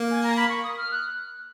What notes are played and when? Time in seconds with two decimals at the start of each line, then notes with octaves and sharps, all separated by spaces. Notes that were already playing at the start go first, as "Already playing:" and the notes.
Already playing: A#3
0.11 G#5
0.24 A#5
0.36 B5
0.49 C#6
0.64 D#6
0.78 F6
0.92 F#6